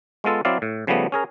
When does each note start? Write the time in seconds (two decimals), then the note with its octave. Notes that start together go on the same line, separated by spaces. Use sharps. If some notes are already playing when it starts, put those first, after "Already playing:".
0.24 G#3 B3 F4 A4
0.45 F#3 C4 E4 D5 F5
0.62 A2
0.87 C#3 F3 G3 A3 B3
1.12 C#4 G#4 A#4